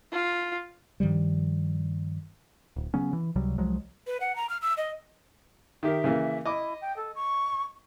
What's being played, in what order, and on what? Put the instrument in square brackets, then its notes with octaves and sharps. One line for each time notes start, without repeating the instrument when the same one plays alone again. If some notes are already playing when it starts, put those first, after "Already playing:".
[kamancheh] F4
[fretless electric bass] G2 D#3 F3 G3
[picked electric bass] D1
C#3 F#3 B3 C#4
E3
C#2 C3 F#3 G3
C2 F3 F#3 G#3
[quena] B4
F#5
A#5
F6
E6
D#5
[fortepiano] D#3 G4 A#4 [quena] E5
[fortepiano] C#3 E3 A#3
[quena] E4 [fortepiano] D#5 D6
[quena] G5
A4
C#6